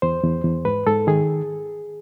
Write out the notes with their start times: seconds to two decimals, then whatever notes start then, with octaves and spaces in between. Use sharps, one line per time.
0.02 E2 C5
0.23 E2
0.44 E2
0.65 G#2 B4
0.86 G#2 A4
1.07 D#3 G#4